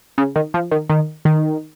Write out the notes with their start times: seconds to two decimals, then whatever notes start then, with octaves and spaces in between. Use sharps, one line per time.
0.18 C#3
0.36 D#3
0.54 F3
0.71 D#3
0.90 D#3
1.25 D#3